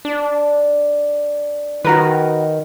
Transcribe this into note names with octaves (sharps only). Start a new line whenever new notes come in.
D4
D#3 F#4 A#4 B4